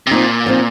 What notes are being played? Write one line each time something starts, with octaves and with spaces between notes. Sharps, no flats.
C3
A#2 F3 C4 D#4
F3 C4 D#4